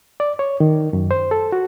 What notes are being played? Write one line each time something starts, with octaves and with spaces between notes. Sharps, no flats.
D5
C#5
D#3
F#2
C5
A4
F#4